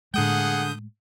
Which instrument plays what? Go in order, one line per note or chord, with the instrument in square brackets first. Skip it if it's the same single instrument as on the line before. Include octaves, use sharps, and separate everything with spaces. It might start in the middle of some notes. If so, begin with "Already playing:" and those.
[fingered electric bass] A2 G#3 [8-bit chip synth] D3 D#6 G6 [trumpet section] A#3 G#4 F#5